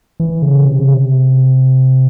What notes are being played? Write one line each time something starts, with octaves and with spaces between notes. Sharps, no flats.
E3
C#3
C3
C#3
C3